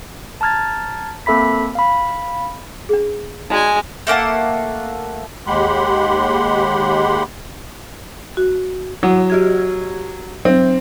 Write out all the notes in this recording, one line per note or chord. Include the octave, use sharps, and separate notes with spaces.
A5 A#5 F6 G#6 A6
A#3 C4 A4 E5 B5 B6
F5 B5
D4 G#4
G#3 D#4 F#4 D5 G#5
A3 A#3 F#5 A5
D#2 G#3 G4 F#5 B5 C6
F#4
F#3 E4 F#5
F#4 G4 G#6
F#3 C4